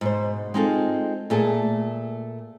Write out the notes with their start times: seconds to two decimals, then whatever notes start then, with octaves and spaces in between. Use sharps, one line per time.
0.01 G#2 B2 C5
0.54 G#3 C4 D#4 F4 G#4 A4
1.30 A#2 A3 G#4 A5